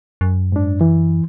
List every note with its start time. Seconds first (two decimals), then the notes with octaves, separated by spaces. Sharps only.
0.21 F#2
0.52 G#2 D4
0.81 E3